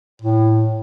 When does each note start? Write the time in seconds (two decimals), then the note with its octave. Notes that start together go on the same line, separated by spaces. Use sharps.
0.22 A2